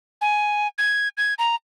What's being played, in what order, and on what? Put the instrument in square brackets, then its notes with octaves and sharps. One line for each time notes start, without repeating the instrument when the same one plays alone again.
[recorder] G#5
G#6
G#6
A#5